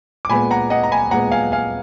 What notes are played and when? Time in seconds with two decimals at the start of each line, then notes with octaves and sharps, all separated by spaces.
0.25 D6
0.30 A#2 G#3 B3 G#5 B5
0.51 F#5 A#5
0.70 D#5 F#5
0.83 A#5
0.91 G#5 B5
1.11 A#2 G#3 B3 F#5 A#5
1.31 F5 G#5
1.52 F5 G#5